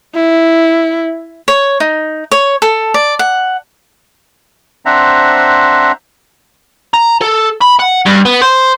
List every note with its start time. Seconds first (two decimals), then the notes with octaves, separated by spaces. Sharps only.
0.16 E4
1.48 C#5
1.80 D#4
2.32 C#5
2.62 A4
2.94 D5
3.19 F#5
4.86 C4 D4 C5 E5 F#5 A#5
6.94 A#5
7.21 A4
7.61 B5
7.79 F#5
8.06 G2
8.25 B3
8.41 C5